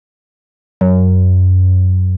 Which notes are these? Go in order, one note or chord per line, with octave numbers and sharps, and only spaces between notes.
F#2